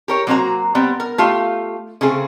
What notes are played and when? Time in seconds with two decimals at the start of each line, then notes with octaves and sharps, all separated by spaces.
0.08 G4 A#4 C#5
0.27 F#3 A#3 C4 D4 F#4 A#5
0.75 G3 B3 C4
1.00 A#4
1.18 A3 F4 G4 F5
2.01 C#3 A3 C4 G#4